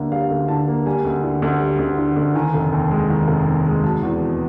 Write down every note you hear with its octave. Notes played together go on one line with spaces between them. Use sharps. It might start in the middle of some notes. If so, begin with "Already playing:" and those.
Already playing: D2 D3 G3 A#3 E5
G3 F5
D2
D3 A5
A#3
G3 G#5
D2
D3
D2
G3
D2
D3
D2
D#3 G#5
F1
D#2
G#3
D#3
F1
D#2
G#3
F#3 A5
E2
B2